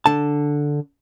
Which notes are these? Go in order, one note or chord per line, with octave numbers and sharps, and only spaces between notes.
D3 A5